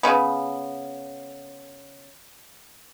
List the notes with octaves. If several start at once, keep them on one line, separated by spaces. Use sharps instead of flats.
C#3 B3